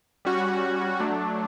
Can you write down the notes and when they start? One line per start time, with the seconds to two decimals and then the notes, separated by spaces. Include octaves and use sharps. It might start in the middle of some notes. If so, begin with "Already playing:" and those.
0.25 G3 C#4 F#4
1.00 F#3 A3 D4